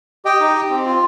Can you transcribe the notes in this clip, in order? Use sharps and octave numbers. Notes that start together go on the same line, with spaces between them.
G4 D#5 G5
D#4
G4
C4
F4